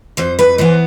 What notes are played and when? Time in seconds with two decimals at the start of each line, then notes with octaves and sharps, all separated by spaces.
0.17 F2 C5
0.39 B4
0.58 E3 B3 C5